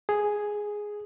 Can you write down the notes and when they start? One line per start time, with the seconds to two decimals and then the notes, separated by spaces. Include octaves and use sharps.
0.09 G#4